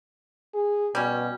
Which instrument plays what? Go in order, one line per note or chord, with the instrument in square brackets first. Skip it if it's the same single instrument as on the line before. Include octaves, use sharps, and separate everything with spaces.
[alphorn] G#4
[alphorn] B2 [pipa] G3 C#4